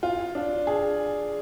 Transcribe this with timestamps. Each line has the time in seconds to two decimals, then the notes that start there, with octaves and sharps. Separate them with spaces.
0.03 F4
0.35 D4
0.67 G#4